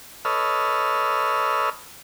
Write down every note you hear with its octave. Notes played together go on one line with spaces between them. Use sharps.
A4 B4 C#5 D#5 E6 F6